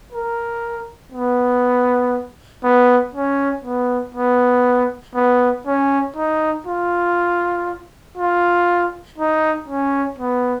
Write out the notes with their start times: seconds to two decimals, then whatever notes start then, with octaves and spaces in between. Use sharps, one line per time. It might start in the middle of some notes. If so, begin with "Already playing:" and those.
0.12 A#4
1.12 B3
2.63 B3
3.15 C#4
3.65 B3
4.15 B3
5.15 B3
5.66 C#4
6.16 D#4
6.67 F4
8.17 F4
9.18 D#4
9.68 C#4
10.19 B3